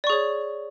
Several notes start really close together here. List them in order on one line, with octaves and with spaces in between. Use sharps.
D5 C#6 G#4 C#5